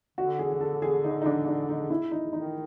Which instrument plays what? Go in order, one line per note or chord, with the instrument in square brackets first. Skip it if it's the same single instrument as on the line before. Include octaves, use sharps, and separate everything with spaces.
[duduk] D3 [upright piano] F#4
[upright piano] G#4
G#4
A4
G#4
D#4
D#4
D4
D#4
D#4
E4
D#4
[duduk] D#3 [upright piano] D#4